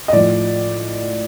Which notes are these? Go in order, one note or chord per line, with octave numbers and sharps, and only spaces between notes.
D#5
A2 F3 D5